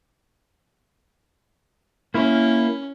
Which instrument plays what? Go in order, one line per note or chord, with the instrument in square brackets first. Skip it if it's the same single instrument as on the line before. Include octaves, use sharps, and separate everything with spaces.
[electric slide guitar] A#3 E4 [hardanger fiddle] C#4